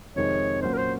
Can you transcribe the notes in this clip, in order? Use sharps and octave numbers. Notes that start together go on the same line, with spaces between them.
F2 C3 D#3 G#3 D#4 C#5
A#2 F#3 A#3 C#4 C5
A#4
C5